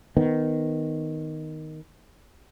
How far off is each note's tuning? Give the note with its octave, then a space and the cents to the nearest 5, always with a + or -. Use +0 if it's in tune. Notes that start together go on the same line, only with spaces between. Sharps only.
D#3 +0 B3 +10